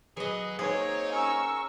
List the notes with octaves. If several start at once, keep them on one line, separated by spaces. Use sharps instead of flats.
B2 F#3 G#4 B4 D#5
A#3 C4 D#4 G#4 C#5
C#4 A#4 C#6 E6